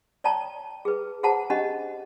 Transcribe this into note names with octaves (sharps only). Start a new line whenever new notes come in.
C#5 D5 G5 A5 A#5
G#4 B4
G#4 C5 F#5 A5 A#5
C#4 D4 G4 D#5 F#5